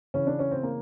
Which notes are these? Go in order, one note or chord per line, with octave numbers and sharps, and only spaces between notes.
C#3 E3 C#4
D4
C#4
C4
A#3